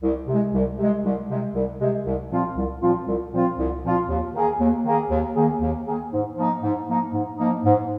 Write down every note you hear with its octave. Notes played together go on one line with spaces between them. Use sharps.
C2
C3 G#3
C2
C3 G#3
C2
C3 G#3
C2
C3 G#3
C2
A#2 F3 C4 F4
C2
A#2 F3 C4 F4
C2
A#2 F3 C4 F4
C2
A#2 F3 C4 F4
D#2
D#3 A#3 G#4
D#2
D#3 A#3 G#4
D#2
D#3 A#3 G#4
D#2
D#3 A#3 G#4
G#2
F3 A#3 D#4
G#2
F3 A#3 D#4
G#2
F3 A#3 D#4
G#2